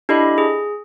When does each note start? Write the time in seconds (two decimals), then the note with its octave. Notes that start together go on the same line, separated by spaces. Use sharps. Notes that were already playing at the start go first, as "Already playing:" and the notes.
0.09 D4 E4 G4 A4 D#5 B5
0.38 G#4